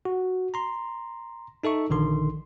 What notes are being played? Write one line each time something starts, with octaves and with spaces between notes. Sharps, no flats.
F#4
A#5 C6
D#4 A4 E5 C#6
A#1 D3 D#3 C6